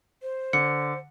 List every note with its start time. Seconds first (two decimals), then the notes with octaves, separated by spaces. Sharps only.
0.22 C5
0.53 D3 C#7